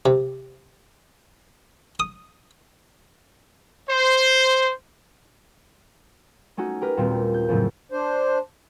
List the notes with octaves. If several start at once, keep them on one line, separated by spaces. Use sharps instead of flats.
C3
D#6
C5
A3 C#4 D#4 F#4
G4 A#4 B4
D#2 A#2 G3 C4 D4
G6
F2 A2 C#3 F#3 A3
D4 C5